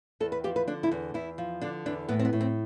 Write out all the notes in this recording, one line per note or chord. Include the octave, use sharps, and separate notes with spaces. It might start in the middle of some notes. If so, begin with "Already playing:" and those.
E2 A4
B4
F3 G4
B4
D3 D4
E4
E2
E2 E4
F3
D3 D4
E2 D4
A2 B3
C4
B3
A2
C4